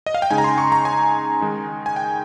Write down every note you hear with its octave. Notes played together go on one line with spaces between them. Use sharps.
D#5
F5
G5
C#3 G#3 D#4 G#5
A#5
C6
C#6
A#5
G#5
D#3 G#3 D#4
G#5
G5